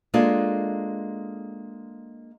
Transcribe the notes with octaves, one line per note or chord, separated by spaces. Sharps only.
G#3 A#3 D4 F4 G#4 A4